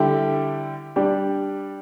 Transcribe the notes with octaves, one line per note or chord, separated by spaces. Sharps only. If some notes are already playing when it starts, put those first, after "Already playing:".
Already playing: D3 G3 E4 G4
G3 D4 G4